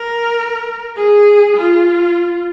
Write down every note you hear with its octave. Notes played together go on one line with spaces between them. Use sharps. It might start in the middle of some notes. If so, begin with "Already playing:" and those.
Already playing: A#4
G#4
F4